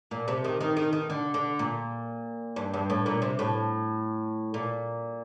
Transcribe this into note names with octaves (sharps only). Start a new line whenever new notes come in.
A#2
C3
D#3
D#3
D#3
D#3
D3
D3
A#2
G2
G2
A2
A#2
C3
A2
A#2